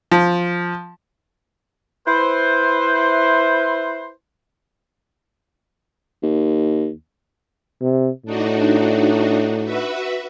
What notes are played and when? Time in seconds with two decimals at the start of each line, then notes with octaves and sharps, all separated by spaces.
0.12 F3
2.07 E4 B4 C5
6.23 D#2
7.82 C3
8.25 A2 D4 D#4 F#4
9.64 F#4 B4 E5